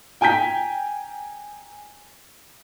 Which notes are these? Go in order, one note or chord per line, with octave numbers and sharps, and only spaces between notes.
G5 G#5 A#5 G6 B6